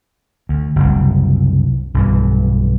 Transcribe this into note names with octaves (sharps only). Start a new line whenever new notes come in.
D2
F#1 C2
B1 G2 E3